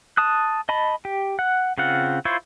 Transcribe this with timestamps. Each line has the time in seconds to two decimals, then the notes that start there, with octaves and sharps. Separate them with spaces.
0.17 A5 D#6 F#6
0.69 D#5 A5 B5
1.05 G4
1.39 F#5
1.78 C#3 C4 F4 F#5
2.25 E4 F4 C5 C#5